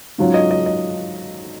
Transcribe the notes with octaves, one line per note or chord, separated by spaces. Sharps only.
G#2 F#3 C#4 F4
D#5
D#5
D#5